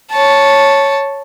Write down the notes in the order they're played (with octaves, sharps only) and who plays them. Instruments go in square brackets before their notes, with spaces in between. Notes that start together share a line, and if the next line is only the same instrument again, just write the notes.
[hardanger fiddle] C#5 A5